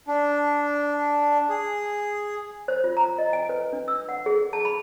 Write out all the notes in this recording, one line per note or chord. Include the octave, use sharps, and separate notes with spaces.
D4
G#4
C5
F4
A#5
D#5
G#5
B4
D4
E6
F#5
G#4
A5
B5